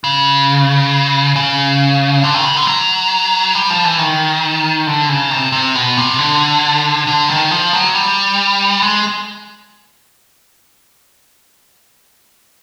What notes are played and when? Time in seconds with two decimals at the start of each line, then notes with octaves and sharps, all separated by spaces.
0.04 C#3
1.36 C#3
2.23 D3
2.34 D#3
2.45 C#3
2.56 D3
2.67 F#3
3.55 G3
3.70 F3
3.84 E3
3.99 D#3
4.87 D3
5.09 C#3
5.31 C3
5.52 C3
5.75 B2
5.97 C3
6.18 D3
7.07 D3
7.29 D#3
7.51 F3
7.73 F#3
7.95 G3
8.82 G#3